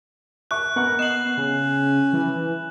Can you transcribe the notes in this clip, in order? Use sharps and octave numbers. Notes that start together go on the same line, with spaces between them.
E5 C#6 F#6
B3 A#4 F#5 C#6
B3 D#5 C7 E7 F#7
B3
C#3 C#4
E3